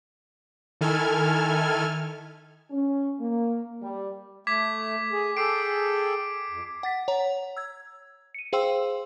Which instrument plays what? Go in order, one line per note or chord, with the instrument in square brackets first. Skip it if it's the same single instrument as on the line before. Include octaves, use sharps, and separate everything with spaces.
[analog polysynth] D#3 E4 A4 G#5 F6 G#6
[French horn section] C#4
A#3
G3
[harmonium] A3 [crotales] D6 G#6 B6
[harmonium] G#4
[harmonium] G#4 A4 G5 [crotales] D6 C7 D7
[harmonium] F2
[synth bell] F#5 A6 B6
C#5 F#5 A#5
E6 G#6
C#7 D#7
G#4 C5 F5 G5 C6 E6